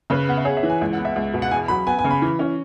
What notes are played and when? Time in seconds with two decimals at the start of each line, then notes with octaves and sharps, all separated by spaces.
0.10 C#3 B4
0.28 B3 F#5
0.37 E5
0.45 G#4 C#5
0.57 E5
0.63 E3
0.70 G#5
0.81 C#2
0.93 F#5
0.98 B3
1.05 E5
1.16 C#2
1.34 B2
1.42 F#5
1.51 E2 G#5
1.68 F#3 B5
1.87 B3 G#5
1.99 G#5
2.04 C#3
2.11 B5
2.22 E3
2.39 C#4